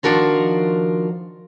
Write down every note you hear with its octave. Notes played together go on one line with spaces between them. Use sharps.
D#3 F3 D4 F#4 A#4 C5